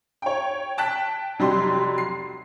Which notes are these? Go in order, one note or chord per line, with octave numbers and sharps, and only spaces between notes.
C#5 G5
G5 A5 F#6 B6
F1 F#3 G3 G4 C6
C7